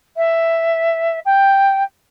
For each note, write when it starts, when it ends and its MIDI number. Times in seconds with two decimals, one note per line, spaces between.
0.17 1.19 76
1.25 1.83 79